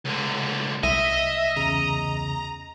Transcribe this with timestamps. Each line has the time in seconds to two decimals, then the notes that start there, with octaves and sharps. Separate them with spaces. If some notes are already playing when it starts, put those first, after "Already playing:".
0.05 C#2 D3
0.83 C2 D#5 E5
1.56 E2 C#3 A#5